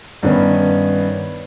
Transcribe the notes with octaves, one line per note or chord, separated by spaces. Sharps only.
G2 D#3 B3 C#4